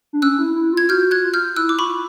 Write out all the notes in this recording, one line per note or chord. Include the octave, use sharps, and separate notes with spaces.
D4
C#4 E6 F#6
E4
E4
F4 G#6
F#4 F6 G6
F#6 G#6
F4
F6 G6
E4 E6 F#6
D6
F4 B5 C#6